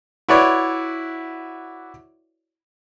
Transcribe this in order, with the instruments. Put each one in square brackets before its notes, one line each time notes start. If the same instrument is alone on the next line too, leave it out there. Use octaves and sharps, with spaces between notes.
[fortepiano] E4 F#4 B4 C#5 D5